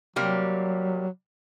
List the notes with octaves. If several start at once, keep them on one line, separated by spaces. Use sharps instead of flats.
C3 F#3 G3 A#3